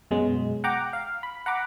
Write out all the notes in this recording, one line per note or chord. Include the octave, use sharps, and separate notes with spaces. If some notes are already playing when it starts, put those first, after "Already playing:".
F#2 B2 F#3 G#3
F#5 G5 A#5 D6
F5
B5
F#5 A#5 B5 D6